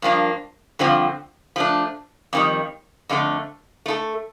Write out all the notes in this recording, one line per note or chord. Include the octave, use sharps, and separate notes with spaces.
G2 F3 A#3 D4
G2 D3 F3 C4
F3 A3 D4
F2 D#3 G3
F2 D3 A3
A3 D#4 A4